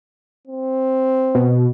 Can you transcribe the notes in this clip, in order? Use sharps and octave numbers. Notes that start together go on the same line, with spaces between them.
C4
B2